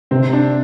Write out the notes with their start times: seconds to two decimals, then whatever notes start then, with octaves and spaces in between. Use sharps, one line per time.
0.11 C3 C4
0.33 D4